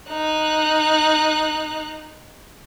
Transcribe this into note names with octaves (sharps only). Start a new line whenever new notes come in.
D#4 F#6